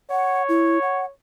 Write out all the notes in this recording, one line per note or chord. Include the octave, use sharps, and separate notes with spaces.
C#5 F#5
E4
F#5